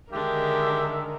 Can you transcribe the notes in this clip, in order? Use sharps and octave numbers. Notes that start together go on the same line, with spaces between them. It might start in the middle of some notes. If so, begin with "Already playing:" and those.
D3 D#3 G#3 D4 G4 A#4 E5